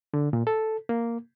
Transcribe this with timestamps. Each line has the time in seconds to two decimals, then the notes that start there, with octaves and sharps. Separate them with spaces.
0.14 D3
0.33 A#2
0.47 A4
0.89 A#3